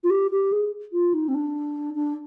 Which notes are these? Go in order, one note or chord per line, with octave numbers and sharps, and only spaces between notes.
F4
G4
G4
G#4
F4
D#4
C4
D4
D4